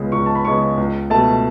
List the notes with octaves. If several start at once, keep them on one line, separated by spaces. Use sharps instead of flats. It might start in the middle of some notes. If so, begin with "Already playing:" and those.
Already playing: C#2 C#3 G#3 B3
C#2 C#6
A5
B5
C#3 G#3 B3 C#6
C#2
B2 A3 A5